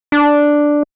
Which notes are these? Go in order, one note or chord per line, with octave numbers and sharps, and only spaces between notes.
D4